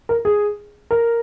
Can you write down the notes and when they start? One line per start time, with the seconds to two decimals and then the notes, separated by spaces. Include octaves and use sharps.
0.09 A#4
0.25 G#4
0.91 A#4